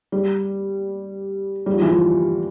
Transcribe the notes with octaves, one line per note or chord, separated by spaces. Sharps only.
G3
G3
F3
E3
F3